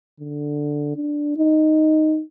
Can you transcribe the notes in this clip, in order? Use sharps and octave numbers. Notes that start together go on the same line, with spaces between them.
D3
D4
D#4